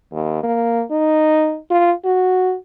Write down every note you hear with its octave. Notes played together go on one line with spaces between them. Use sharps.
D#2
A#3
D#4
F4
F#4